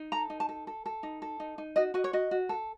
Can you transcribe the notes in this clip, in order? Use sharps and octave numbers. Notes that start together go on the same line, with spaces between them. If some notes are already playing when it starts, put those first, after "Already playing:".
Already playing: D#4
A4 A#5
D#4
A5
A4
A4
A4
D#4
A4
D#4
D#4
F#4 D#5
F#4 D#5
C#5
F#4 D#5
F#4
A4